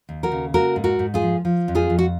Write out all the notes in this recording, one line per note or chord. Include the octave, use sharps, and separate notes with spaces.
D#2
F#4 A#4
C#3
A#3 F#4 A#4
G#2
F#4 A#4
G#2
F4 G#4
F3
F3
F2
F4 G#4
F2
F#4